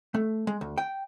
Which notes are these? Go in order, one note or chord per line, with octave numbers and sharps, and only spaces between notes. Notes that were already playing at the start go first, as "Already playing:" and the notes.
A3
G#3
D2
G5